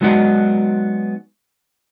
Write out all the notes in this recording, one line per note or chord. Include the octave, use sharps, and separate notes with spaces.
F#3 G#3 B3 D#4 F#4 D5